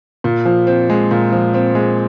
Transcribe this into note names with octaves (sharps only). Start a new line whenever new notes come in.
A#2
F3
C4
G#3
A#2
F3
C4
G#3